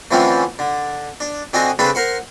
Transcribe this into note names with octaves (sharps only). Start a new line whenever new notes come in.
D3 E3 F3 A3 C4 C#4
D3
D4
D3 C4 F#4 D#5 G#5 D#6
C#3 C4 D4 A4 B4
A#4 C5 F#5